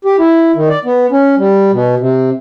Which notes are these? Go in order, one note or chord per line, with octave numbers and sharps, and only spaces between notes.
G4
E4
D#3
D5
B3
C#4
G3
B2
C3